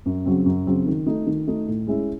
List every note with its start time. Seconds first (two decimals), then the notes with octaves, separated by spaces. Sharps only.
0.06 F#2
0.26 C#3 F#3 C4
0.46 F#2
0.67 C#3 F#3 C4
0.86 D#3
1.07 A3 D#4
1.26 D#3
1.47 A3 D#4
1.68 A2
1.87 G#3 C#4 E4